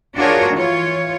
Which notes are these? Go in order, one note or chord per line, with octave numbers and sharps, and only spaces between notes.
D4 F4 F#4 G#4 A#4 C#5
E3 F4 C#5